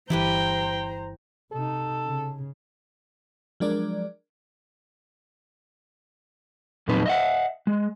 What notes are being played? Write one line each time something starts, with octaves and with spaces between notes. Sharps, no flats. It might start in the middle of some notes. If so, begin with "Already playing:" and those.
G1 E3 E4 G4 B4 C5 G5 A#5
C3 D#4 A4
C#3
F3 F#3 G#3 D4 A#4 D5
E2 A#2 F#3 C4 D#4 B4
D#5 E5 F#5
G#3